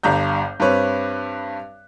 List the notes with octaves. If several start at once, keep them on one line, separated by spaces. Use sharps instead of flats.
G1 G2 A#5 G6
G2 G3 C4 B4 C#5 F#6